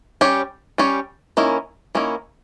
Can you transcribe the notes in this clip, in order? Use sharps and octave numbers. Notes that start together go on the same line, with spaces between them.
G3 C#4 G4 C#5
G3 C#4 G4 C#5
D#3 A#3 C#4 E4 A#4
D#3 A#3 C#4 E4 A#4